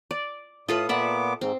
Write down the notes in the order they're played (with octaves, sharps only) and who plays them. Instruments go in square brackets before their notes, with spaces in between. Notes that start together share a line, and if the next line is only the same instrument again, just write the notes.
[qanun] D5
[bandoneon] A2 D#6 [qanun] F4 A4 B4
[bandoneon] A#2 B3 D6 [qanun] D5 E5 F#5
[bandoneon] G#2 [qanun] C4